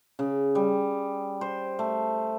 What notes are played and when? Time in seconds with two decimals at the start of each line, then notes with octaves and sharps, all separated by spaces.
0.19 C#3
0.55 G3
1.41 C5
1.79 A3